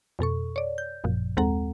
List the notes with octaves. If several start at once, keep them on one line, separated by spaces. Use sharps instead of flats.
F2 B2 A4 C#6
C#5 D5
G6
G#1 F#2 A#2 F3
D#2 G#3 C4 A4 F#5 A#5